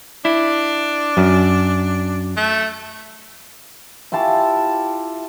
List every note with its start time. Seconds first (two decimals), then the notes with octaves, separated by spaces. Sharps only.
0.25 D4 E4
1.17 F#2
2.37 A3
4.12 E4 F4 G4 A5